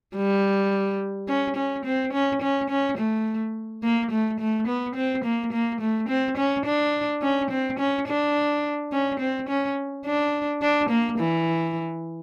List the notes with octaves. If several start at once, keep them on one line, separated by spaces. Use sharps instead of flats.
G3
C#4
C#4
C4
C#4
C#4
C#4
A3
A#3
A3
A3
B3
C4
A#3
A#3
A3
C4
C#4
D4
C#4
C4
C#4
D4
C#4
C4
C#4
D4
D4
A#3
E3